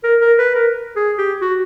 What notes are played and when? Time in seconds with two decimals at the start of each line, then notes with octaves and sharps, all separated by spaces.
0.04 A#4
0.21 A#4
0.39 B4
0.55 A#4
0.96 G#4
1.18 G4
1.42 F#4